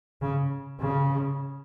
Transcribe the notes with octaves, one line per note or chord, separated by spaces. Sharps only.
C#3
C#3